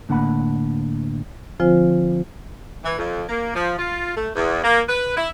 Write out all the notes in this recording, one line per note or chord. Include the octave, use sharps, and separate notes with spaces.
A2 D3 A#3 F#5 B5
D3 F3 C4 F4 C5 G#5
E3
F2
A#3
F3
F4
A3
E2
A#3
B4
E4